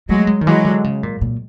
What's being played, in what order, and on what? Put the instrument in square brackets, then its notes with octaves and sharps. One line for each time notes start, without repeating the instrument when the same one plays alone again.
[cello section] F#3 G#3 [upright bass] A3
[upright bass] G#3
D#3
[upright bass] E3 [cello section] F#3 G#3
[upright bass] D3
C#3
A#2
A#2